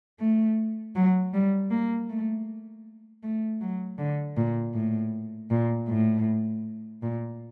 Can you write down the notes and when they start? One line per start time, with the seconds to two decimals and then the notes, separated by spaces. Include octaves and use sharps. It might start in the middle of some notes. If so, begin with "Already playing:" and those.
0.20 A3
0.95 F#3
1.33 G3
1.71 A#3
2.10 A3
3.23 A3
3.61 F#3
3.98 D3
4.37 A#2
4.74 A2
5.51 A#2
5.89 A2
7.03 A#2